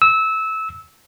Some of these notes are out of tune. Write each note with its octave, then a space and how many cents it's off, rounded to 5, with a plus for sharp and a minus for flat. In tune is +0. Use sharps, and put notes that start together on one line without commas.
E6 -20